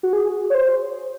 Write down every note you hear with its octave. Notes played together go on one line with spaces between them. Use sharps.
F#4
G#4
C#5
C5